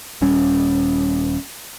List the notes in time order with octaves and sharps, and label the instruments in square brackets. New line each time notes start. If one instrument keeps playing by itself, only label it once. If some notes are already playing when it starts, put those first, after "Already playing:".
[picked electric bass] D#1 G3 C#4